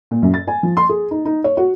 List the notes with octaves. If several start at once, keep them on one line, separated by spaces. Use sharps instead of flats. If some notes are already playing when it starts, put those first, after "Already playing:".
A#2
F#2
A6
G#5
F3
C6
G#4
D#4
D#4
C#5
F#4